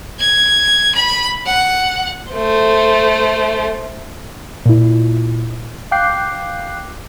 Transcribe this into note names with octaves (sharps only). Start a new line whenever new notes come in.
G#6
B5
F#5
A3 C5
A#2 E4
F5 G5 D6 F#6 G6 C7